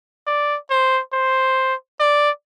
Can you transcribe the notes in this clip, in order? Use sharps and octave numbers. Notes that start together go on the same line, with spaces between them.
D5
C5
C5
D5